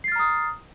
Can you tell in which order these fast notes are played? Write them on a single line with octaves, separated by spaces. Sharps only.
C7 A6 F6 A#5 D#6